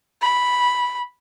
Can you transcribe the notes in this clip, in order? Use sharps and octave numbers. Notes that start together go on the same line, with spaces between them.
B5